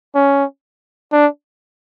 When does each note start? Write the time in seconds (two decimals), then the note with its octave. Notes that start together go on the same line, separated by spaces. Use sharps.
0.15 C#4
1.12 D4